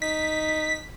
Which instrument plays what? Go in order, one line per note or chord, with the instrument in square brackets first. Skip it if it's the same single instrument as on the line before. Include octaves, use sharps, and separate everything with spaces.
[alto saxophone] D#4 [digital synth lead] B6